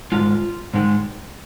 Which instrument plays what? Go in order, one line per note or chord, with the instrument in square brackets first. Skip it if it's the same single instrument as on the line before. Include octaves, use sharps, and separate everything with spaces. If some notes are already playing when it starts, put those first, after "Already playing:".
[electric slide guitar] G#2 D#3 G#3 F4
G#2 D#3 G#3